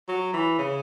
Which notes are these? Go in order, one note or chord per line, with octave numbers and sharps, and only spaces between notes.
F#3
E3
C#3